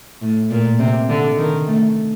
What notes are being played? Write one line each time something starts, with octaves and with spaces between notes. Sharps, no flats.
A2
A#2
C3
D3
D#3
A3